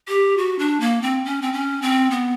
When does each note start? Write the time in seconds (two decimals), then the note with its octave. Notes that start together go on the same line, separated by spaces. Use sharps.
0.08 G4
0.38 F#4
0.59 D4
0.80 A#3
1.02 C4
1.25 C#4
1.42 C4
1.53 C#4
1.82 C4
2.11 B3